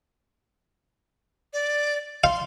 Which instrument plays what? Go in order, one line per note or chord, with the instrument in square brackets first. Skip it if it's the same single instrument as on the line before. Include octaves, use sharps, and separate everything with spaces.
[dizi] D5
[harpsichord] F5 [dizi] C6